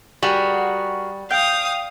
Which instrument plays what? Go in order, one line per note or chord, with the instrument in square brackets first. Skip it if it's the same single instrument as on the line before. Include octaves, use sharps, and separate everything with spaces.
[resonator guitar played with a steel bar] G3 [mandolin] F#4 G#4 A#4
[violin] F5 D#6 [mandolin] G5